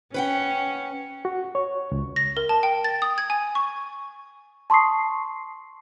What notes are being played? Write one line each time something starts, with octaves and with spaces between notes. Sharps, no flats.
C#4 B4 F#5 G5
F#4
C#5
C#2
A#6
A#4
A5
G5
A6
D#6
G#6
G#5
C#6
A5 C6 C#6 D#6 C7